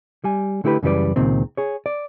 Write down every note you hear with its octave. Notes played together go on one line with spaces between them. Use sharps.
G3 G#5
D3 A3 E4 G4 B4
F#2 C#3 E3 G3 B4 D5
C#2 A#2 D#3 C4
G#4 C#5
D5